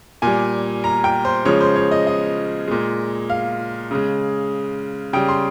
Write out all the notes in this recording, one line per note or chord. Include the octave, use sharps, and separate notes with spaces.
A#2 G3 G#5
A#5
G5
C5
C#3 F3 G#3 C#5
C5
C#5
D#5
D#5
A#2 G#3
F5
C#3 G#3
C#3 G3 G5
C6